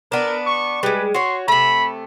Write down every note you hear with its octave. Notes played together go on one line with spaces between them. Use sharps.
B3 D4 A#4
C#6
G3 G#3 B4
F#4 C#5 C6
C3 A3 B5